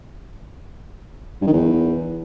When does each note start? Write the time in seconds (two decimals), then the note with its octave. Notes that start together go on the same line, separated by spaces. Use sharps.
1.41 G2
1.47 D#3
1.53 E2